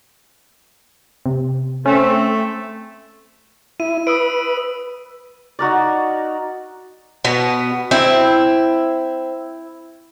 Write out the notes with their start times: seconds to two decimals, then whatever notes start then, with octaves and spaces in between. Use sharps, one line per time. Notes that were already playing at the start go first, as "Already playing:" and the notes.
1.26 C3
1.86 A3 C4 C#4
3.80 E4 D#7
4.07 B4 D#6 E6 D7
5.59 D#4 F#4 A#4 D5
7.25 B2 B3
7.91 C4 E4